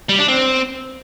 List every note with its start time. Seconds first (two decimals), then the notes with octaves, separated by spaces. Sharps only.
0.09 G3
0.19 D4
0.28 C4